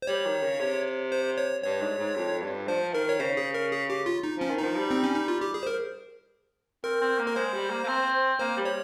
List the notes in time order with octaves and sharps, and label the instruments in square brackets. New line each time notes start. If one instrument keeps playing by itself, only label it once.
[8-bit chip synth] C5
[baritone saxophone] G3 [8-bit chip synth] C#5
[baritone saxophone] D#3
C#3
C3
[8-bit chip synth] C5
C#5
[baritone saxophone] G2 [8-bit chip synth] C#5
[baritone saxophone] G#2
G#2
F2
G2
[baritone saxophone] F3 [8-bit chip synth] C5
[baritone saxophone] D#3 [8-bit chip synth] A#4
[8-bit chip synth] C#5
[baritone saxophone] C#3 [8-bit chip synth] C5
[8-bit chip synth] G#4
A#4
G#4
G4
F4
D#4
[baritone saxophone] F3 [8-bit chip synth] C#4
[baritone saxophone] D#3
[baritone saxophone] F3 [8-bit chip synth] D#4
[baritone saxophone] G3
[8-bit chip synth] C4
C#4
D#4
F4
G4
G#4
C5
A#4
[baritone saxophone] C4 [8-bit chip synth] A#4
[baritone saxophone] C4
A#3
[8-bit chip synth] A#4
[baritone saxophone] G#3 [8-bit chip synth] C5
[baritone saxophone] G3
A#3
A#3
C4
[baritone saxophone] A#3 [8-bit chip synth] C5
[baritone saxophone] G3
[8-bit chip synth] C#5